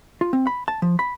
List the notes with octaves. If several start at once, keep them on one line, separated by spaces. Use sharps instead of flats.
F4
C4
B5
A5
F3
B5